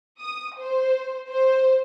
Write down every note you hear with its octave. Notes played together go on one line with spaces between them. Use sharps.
D#6
C5
C5